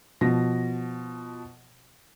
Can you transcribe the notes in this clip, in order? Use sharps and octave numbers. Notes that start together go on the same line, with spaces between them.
B2 F3 A#6